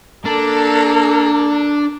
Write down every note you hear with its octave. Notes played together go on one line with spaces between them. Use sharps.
A#3 D4 A4